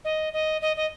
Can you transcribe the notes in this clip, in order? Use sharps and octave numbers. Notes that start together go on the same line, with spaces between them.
D#5
D#5
D#5
D#5